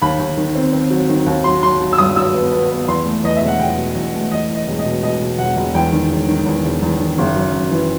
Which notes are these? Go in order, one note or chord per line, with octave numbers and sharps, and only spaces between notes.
D#2 B5
D#2
D#3
C4
C4
F#3
D#3
D#2
F#3 C6
F#3 C6
F#3
E6
G2 D#6
F#3 E6
B3
B3
B3
E2 C6
A3
E2 D#5
E1 E5
F#5
E1 G5
B2
E2
A3
E2 D#5
E2
D#5
E1
D#5
B2
B2 D#5
B2
E1 F#5
E1
E2 G5
D#3
E1
D#3
E2
E1
E2
D#3
F#1
F#2
F#2
E3